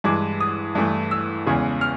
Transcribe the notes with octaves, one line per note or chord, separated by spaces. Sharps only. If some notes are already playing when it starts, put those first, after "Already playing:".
G2 E3 G#3 D6
D#6
G2 E3 A3
E6
E2 C#3 E3 G#3
F6